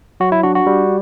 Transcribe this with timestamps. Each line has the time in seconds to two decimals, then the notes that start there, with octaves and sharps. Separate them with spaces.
0.20 F#3 F#4
0.32 E4
0.43 D4 F#4
0.55 F#4
0.67 G3